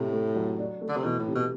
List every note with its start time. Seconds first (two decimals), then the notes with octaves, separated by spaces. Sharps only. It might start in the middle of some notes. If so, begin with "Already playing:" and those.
Already playing: A2 C3
0.12 A3
0.35 F#3
0.58 D4
0.81 A3
0.89 D3
0.97 C3
1.04 B2 E3
1.20 A2
1.28 C3
1.35 B2